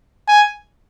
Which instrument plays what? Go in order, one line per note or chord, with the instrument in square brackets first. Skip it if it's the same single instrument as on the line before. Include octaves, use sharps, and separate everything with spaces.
[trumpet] G#5